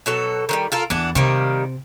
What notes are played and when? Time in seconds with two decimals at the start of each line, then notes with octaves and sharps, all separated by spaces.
0.06 B2 F#3 A4
0.49 D#3 F#3 G3
0.72 F4 A4 A#4
0.90 E2 E3 B3 D4
1.15 C3 D#3 G3 A#3